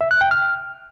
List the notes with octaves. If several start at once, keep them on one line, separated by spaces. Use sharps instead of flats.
E5
F#6
G5
F6